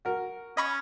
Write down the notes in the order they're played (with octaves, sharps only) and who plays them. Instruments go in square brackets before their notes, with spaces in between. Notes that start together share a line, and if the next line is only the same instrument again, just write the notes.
[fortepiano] F#4 A#4
[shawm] C#4 [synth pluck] D#5 B5 C#6